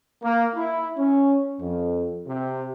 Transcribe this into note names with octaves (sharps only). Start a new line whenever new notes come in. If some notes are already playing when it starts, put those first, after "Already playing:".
A#3
E4
C#4
F2
C3